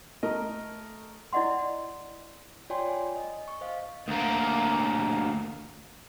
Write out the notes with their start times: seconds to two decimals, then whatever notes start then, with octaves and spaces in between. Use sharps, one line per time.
0.23 A3 A#4 D#5
1.33 E4 D5 D#5 F#5 C6
2.70 F4 C#5 D5 G5 G#5 C6
2.89 G#5
3.16 D#5
3.48 C#6
3.61 C5 D#5 F5
4.08 D2 A#3